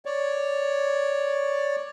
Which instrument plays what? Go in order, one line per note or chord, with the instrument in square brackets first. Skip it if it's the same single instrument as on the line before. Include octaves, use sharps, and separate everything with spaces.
[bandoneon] C#5 D5